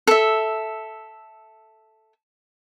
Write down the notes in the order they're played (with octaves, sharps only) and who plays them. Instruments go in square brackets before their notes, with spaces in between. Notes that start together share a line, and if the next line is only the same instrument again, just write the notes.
[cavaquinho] A4 E5